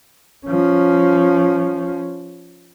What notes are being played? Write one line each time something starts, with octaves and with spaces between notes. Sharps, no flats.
F3 C#4